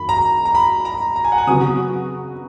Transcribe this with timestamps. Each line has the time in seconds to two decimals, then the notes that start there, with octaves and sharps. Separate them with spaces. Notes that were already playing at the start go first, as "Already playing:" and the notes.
Already playing: F#2 D#3 A#3 B5
0.09 A#5
0.45 A#5
0.55 B5
0.85 A#5
1.16 A#5
1.25 G#5
1.32 F#5
1.38 G#5
1.47 C#3 F#3 B3 F#4 D#6